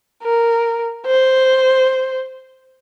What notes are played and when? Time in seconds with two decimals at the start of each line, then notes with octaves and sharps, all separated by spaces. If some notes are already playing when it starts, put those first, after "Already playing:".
0.23 A#4
1.06 C5